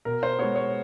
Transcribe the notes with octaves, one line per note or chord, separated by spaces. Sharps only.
B2 A#4
C5
G#3 B3 C#5
C#5